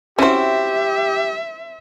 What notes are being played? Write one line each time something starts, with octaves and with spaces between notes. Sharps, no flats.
C4 C#4 E4 F#4 G4 C5 E5